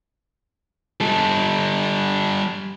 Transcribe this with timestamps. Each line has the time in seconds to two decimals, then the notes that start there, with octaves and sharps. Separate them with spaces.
1.01 G3 A4